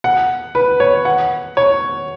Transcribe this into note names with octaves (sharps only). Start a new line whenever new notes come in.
F#5
B4
C#5
F#5
C#5